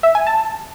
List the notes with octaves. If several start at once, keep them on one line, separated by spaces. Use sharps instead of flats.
E5
G#5
A5